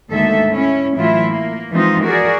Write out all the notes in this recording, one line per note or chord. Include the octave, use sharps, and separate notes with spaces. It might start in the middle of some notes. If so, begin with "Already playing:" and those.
D2 G#2 D#3 A#3 A4 E5
C#4 E4
A2 E3 F#3 E4 F4
A#3
E3 F3 G#3 C4 D#4 F4
F#4 G#4 A#4 D5